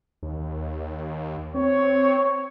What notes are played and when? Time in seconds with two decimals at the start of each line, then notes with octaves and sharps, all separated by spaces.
0.23 D#2
1.54 C4 C#5